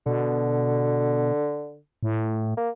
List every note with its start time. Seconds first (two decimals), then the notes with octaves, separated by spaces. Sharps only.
0.06 B2 D3
2.03 A2
2.57 A#3